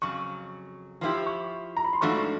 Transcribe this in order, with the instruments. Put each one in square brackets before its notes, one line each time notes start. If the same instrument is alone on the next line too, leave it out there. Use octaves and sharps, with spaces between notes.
[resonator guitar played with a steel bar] F2 C#3 F#3 [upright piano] C#6
[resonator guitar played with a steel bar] F3 G#3 B3 E4 G4 [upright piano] C6
[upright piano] C#6
A#5
B5
C6
[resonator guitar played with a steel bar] G#2 F3 A3 D4 F#4 [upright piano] C#6